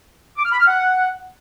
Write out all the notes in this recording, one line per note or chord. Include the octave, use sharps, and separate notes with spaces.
D6
F6
B5
F6
F#5